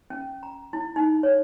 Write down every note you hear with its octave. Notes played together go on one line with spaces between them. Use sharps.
C#4
A#5
E4
D#4
C#5